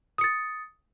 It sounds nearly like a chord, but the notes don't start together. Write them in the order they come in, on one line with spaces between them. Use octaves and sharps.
D#6 C#7 A6